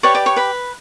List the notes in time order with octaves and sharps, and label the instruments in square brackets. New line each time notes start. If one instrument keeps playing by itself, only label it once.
[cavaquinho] G4 B4 C#5 D5 C#6
D5 D6
C#5 C#6
B4 B5